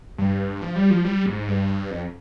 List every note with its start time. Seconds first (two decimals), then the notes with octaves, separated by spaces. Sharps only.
0.18 G2
0.62 F3
0.76 G3
0.90 F3
1.04 G3
1.26 G#2
1.48 G2
1.91 F2